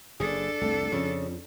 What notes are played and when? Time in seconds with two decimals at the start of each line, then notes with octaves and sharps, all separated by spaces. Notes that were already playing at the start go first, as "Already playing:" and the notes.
0.20 F#1 F#2 D4 G#4 A4
0.61 C2 F2 A3
0.92 F2 C#3 F3